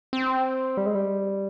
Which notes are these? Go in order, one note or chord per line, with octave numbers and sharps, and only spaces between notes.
C4
G3
G#3
G3